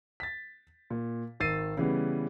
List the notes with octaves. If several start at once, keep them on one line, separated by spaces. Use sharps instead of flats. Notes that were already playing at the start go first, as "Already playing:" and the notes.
A6 B6
A#2
G#1 D#3 E6 A6 C7 D#7
C#3 E3 G3 B3